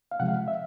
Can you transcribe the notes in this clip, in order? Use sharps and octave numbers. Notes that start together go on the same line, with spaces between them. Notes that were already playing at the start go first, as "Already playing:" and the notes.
F5
C3 F3 G#3 F#5
F5
E5